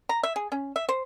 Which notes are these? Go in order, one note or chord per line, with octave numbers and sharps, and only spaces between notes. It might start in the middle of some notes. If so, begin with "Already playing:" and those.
A#5
E5
G#4
C#4
E5
C5